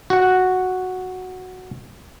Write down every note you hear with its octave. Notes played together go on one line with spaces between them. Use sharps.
F#4 F#5